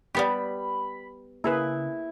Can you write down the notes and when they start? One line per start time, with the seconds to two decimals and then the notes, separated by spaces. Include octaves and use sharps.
0.15 G3 B3 G4 B5
1.44 C#3 A#3 E4 G#4 B4